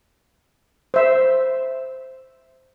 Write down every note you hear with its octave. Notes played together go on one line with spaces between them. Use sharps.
C5 E5